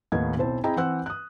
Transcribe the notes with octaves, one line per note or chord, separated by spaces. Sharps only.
D#2 A2 D#3 B3 G#6
B1 C4 E4 C5 A5
C4 E4 G#4 D#5 G5 A#5
E3 C4 C5 F#5 E6 F#6
D#6 F#6